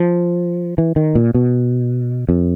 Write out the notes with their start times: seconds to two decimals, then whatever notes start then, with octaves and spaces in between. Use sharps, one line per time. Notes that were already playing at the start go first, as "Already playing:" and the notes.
Already playing: F3
0.78 E3
0.96 D#3
1.15 A#2
1.34 B2
2.29 F2